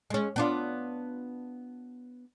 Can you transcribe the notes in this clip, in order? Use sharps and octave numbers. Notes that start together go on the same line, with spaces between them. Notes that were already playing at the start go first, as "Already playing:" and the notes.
G#3 C#4
B3 D4 F4